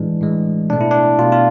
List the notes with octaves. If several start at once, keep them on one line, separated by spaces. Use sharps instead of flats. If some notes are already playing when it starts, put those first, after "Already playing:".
Already playing: A2 E3 G#3 D4
A2 E3 G#3
B2 A3 D4
E4
D4
B2 A3 F4
F4